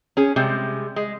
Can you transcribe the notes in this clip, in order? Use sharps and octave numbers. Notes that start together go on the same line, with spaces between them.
C#4 G#4
C3 G3 G#3
G#3